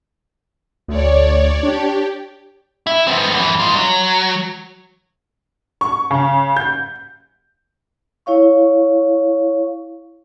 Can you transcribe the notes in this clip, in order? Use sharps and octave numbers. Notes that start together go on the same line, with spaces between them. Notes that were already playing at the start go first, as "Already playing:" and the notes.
D2 C#5 D5
D4 G4
E4
B3 C4
F#2 E3
D#4 F4
F#3
C#6
C#3
G6
E4 C#5 F5 C#6